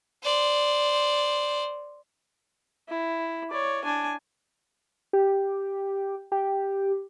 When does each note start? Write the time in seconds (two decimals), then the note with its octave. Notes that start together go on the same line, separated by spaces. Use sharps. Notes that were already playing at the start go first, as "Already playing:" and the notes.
0.23 C5 D5
2.89 E4
3.50 C#5 D5
3.84 D4 G#5
5.13 G4
6.32 G4